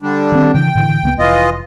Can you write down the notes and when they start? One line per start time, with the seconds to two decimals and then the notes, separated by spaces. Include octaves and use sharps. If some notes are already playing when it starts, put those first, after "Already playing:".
0.02 D3 G3 D4
0.32 D#3 C4
0.54 C#3 E3 G5
0.75 A2 D3 E3
1.03 C#2 A3 B3
1.19 F1 E3 F4 D#5